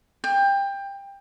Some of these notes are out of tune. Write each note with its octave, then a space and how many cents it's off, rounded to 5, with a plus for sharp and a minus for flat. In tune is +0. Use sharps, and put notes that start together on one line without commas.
G5 +20